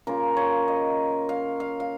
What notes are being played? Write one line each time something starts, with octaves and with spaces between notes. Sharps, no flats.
C#3 A#3 F4 A#4
C#5
D#5
F5
F5
F5